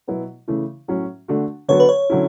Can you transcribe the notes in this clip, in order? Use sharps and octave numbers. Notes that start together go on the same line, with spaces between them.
B2 F#3 B3 E4
C#3 E3 A3 E4
A2 F#3 C#4
D3 A3 D4 F#4
D3 F#3 B3 F#4 C#5
B4
C#5
D3 F#3 C#4 E4